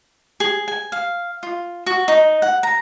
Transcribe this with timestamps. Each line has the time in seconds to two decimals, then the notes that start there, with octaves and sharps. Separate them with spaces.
0.40 G#4
0.68 G#5
0.92 F5
1.43 F4
1.86 F#4
2.08 D#4
2.42 F#5
2.63 A#5